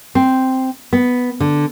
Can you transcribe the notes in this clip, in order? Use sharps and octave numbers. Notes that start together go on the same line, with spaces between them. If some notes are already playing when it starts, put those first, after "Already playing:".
C4
B3
D3